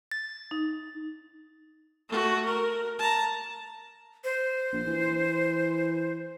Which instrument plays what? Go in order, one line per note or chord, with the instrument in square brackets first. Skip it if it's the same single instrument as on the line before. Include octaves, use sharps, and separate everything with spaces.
[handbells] A6
[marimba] D#4
[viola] A3 F#4
A#4
A5 A#5
[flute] C5
[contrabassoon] A#1
E3